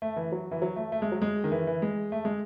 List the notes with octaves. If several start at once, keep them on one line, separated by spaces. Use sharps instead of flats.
A3
E3
F#3
E3
F#3
A3
A3
G#3
F#3
G#3
D#3
E3
E3
G#3
A3
G#3